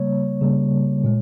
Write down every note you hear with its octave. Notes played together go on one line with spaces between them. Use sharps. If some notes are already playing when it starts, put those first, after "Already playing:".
Already playing: C#3 G3 A#3 C#5
C#3 G3 A#3
A#2 G#3